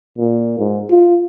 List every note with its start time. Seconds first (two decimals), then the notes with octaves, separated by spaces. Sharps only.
0.18 A#2
0.59 G#2
0.90 F4